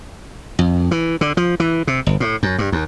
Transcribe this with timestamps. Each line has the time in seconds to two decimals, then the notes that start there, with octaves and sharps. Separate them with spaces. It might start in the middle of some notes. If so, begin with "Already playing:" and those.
0.59 F2
0.91 E3
1.21 D3
1.37 F3
1.60 E3
1.87 C3
2.07 G1
2.20 A2
2.43 F#2
2.58 G2
2.72 D#2